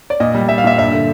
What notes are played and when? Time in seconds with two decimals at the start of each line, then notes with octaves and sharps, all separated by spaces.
0.10 D5
0.20 A#2 D#5
0.34 G3
0.49 G3 E5
0.58 F5
0.64 A#2 E5
0.78 G2 E5
0.92 D3